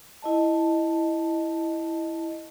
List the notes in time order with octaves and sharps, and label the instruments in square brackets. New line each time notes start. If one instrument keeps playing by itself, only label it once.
[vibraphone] E4 D#5 A5